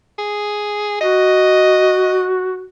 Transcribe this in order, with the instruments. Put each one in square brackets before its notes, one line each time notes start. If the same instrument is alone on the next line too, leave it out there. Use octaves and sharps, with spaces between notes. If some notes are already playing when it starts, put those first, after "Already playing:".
[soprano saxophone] G#4
[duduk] F#4 [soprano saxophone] D#5